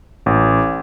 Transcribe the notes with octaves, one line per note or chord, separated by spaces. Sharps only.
A1